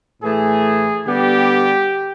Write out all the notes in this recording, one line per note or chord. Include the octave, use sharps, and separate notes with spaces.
A2 E3 A3 G#4
D3 G3 B3 G4